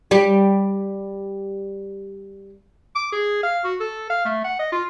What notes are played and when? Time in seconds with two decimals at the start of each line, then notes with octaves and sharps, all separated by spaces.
0.11 G3 G4
2.95 D6
3.12 G#4
3.43 F5
3.64 F#4
3.80 A4
4.10 F5
4.25 A3
4.44 F#5
4.59 D#5
4.72 F4